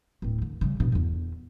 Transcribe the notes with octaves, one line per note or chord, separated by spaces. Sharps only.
D1 C4
D3
C#3 G3
G2 B2
E2 D3